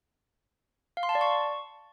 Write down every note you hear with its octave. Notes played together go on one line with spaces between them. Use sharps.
F5
C6
A5
D5
C#6